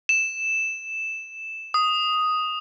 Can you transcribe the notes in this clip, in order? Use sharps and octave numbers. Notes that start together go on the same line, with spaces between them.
E7
D#6